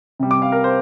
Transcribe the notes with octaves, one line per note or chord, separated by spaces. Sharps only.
C3 G3
D6
F5
A#4
C5